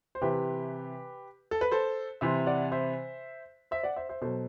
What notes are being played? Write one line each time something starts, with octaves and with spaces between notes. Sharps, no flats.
C5
C3 E3 G4 B4
A4
B4
A4 C5
C3 E3 C5 E5
D5 F#5
C5 E5
C5 E5
D5 F#5
C5 E5
C5 E5
B2 F#3 A4 C5